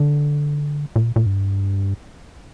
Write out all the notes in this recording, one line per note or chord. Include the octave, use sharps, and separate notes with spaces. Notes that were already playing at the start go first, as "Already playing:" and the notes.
Already playing: D3
A#2
A#2
G2